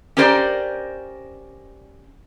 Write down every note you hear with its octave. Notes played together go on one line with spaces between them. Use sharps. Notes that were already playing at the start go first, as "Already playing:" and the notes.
C#4 G4 A#4 C5 D5